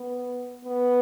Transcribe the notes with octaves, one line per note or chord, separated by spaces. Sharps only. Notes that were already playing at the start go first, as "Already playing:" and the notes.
Already playing: B3
B3